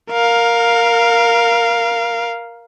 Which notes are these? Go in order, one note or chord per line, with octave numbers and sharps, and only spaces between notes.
A#4 F5